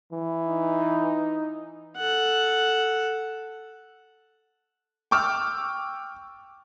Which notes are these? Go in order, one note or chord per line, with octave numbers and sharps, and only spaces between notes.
E3
D#4
A4 F#5
G5 C#6 D6 E6 F6